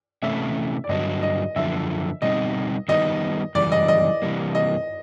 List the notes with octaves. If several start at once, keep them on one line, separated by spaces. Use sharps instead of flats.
C3 E3 A3 C#4 E4 E5
D5
G2 D3 F#3 D#5
D#5
F#2 D3 F3 E5
B2 G3 C4 D#4 D#5
D#3 G3 B3 D#4 D#5
F#2 C#3 E3 G3 D5
D#5
D#5
C3 E3 G3 A#3
D#5